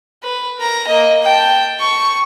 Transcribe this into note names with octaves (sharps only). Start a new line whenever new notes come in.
B4
A#4 A#5
A#3 D#5
G5 A5
C#6